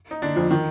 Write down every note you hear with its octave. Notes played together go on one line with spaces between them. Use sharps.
D#4
D3 D4
F2 F3
D#3